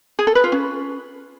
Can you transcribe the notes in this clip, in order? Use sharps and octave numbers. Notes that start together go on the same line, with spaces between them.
G#4
A4
B4
F4
C#4